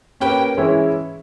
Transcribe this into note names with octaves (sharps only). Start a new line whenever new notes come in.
A#3 C#4 G4 B4 G5
E3 G#3 C#4 E4